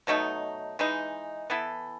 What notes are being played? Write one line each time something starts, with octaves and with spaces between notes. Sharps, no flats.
B2 F#3 A3 D#4
E3 G#3 D#4
E3 B3 E4 A4